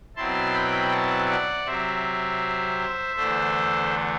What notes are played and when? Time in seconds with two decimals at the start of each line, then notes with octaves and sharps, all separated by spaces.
0.16 B2 F#3 C4 E4 A5 C6
0.54 G5 B5
0.91 F#5 A5
1.28 D5 F#5
1.65 C3 F#3 C4 C5 E5
3.16 E2 D3 A3 A4 C5